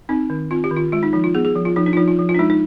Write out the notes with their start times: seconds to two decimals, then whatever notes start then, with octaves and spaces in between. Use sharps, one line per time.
0.09 C4 D#4
0.30 D#3
0.51 C4 F4
0.64 G4
0.71 D#3
0.77 F4
0.92 G#3 F4
1.03 D#4
1.13 F3 D#4
1.24 F4
1.35 B3 G#4
1.45 G#4
1.55 F3
1.65 F4
1.76 F3 D#4
1.86 D4
1.93 F4
1.97 F3 D#4
2.08 F4
2.19 F3
2.29 F4
2.35 D4
2.39 G#3 D#4
2.50 D#4